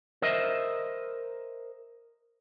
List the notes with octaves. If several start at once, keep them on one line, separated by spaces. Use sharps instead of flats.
A#4 C5 D#5 E5